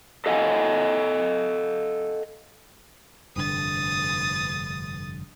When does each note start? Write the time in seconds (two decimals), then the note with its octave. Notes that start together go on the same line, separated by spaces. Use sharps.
0.26 A4 D#5 F5 F#5 G#5
3.36 F1 G2 D3 D#6 A6